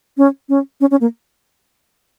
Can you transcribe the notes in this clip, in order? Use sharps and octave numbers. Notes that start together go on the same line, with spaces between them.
C#4
C#4
C#4
C#4
A#3